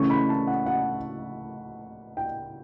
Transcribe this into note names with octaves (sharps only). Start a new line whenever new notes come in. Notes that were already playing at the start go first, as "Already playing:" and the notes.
Already playing: C#3 E3 A3 C#4 C#6
B5
A5
F#5
F#5
G5